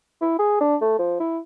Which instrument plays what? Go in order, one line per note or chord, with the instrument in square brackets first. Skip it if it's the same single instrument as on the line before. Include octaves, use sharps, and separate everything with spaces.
[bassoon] E4
G#4
D4
A3
F3
E4